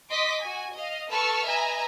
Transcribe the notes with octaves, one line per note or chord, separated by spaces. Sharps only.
D#5 C6 D6 B6
F#4 G#5
D#5 F5
A4 B4 A5 C#6 E6 F6
B4 D#5 E5 G#5 A#5